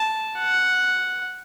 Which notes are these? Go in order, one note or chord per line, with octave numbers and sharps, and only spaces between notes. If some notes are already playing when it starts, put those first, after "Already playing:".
Already playing: A5
F#5